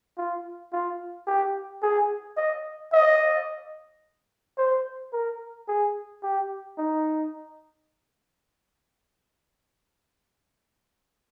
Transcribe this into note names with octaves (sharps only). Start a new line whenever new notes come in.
F4
F4
G4
G#4
D#5
D#5
C5
A#4
G#4
G4
D#4